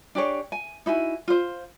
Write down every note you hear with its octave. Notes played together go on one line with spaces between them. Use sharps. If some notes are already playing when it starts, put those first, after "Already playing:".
D4 G4 G#4 C#5
G#5
D#4 E4 F#4 G#5
F4 C5